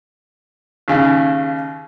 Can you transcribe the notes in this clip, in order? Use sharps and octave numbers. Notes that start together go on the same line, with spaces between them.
D#2 C#3